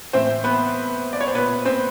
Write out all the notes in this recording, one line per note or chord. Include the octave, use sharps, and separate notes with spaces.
A2 E3 C4 C5
B3 B4
D5
C#5
C5
A#2 B3 B4
C4 C5